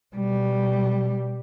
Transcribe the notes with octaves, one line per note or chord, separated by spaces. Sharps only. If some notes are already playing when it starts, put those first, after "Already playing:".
B2 G3